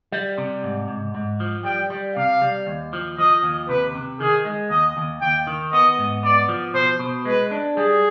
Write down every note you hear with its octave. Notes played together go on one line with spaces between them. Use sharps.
G3
C3
G#2
G#2
G#2
F3
G3 G5
G3
C3 F5
G3
D#2
F3
F3 D#5
D#2
C3 B4
C3
D#3 G#4
G#3
D#2 D#5
D#2
D#2 G5
D#3
B3 D#5
G#2
B3 D5
F3
B2 C5
B2
G#3 B4
D4
G3 G#4